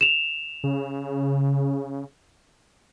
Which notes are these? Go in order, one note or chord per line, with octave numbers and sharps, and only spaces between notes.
E7 F7
C#3